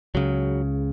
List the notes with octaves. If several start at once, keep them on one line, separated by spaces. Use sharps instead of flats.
C#2 C#3 F#3